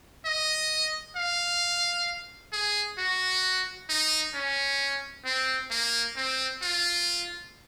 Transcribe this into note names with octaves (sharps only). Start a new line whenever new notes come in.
D#5
F5
G#4
F#4
D#4
C#4
C4
A#3
C4
F4